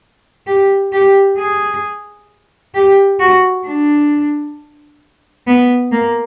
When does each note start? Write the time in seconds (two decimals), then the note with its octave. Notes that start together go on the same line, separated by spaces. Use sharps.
0.47 G4
0.92 G4
1.38 G#4
2.75 G4
3.19 F#4
3.65 D4
5.47 B3
5.92 A#3